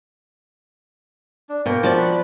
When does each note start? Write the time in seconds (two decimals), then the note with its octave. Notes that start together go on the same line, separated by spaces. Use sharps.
1.49 D4
1.66 B2 A#3 A#4 G5
1.83 F3 F#4 D5
1.97 F#5 B5